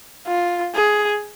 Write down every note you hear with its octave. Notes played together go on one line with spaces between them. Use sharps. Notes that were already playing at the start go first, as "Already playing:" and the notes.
F4
G#4